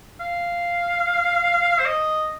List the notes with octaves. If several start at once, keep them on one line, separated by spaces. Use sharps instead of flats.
F5
C5
D#5